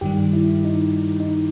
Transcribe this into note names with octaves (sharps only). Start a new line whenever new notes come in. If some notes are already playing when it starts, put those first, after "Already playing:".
G2 D#3 G3 G4
E4
D#4
D#4